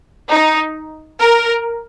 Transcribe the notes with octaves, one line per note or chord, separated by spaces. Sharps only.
D#4
A#4